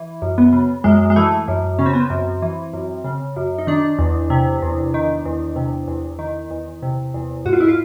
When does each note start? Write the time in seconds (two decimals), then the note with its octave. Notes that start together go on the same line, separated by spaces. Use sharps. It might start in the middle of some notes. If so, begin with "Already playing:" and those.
Already playing: E3
0.22 F#2
0.38 B3
0.53 C#3
0.84 F#2 G#3
1.10 G#3
1.16 E3 A3
1.48 F#2
1.79 C#3 C#4
1.86 C4
1.93 B3
2.00 C4
2.10 F#2
2.42 E3
2.73 F#2
3.04 C#3
3.36 F#2
3.58 D#4
3.67 D#3 D4
3.99 E2
4.30 C3
4.62 E2
4.94 D#3
5.25 E2
5.56 C3
5.87 E2
6.19 D#3
6.50 E2
6.82 C3
7.14 E2
7.46 G#2 F#4
7.53 F4
7.60 E4
7.68 F4